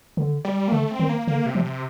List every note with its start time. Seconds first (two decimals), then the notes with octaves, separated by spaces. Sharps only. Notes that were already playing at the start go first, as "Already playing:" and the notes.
0.17 D3
0.45 G3
0.68 A#3
0.72 D3 A3
0.91 C4
1.00 D#3
1.09 A#3
1.27 D3 A#3
1.46 C3
1.55 F3
1.64 C3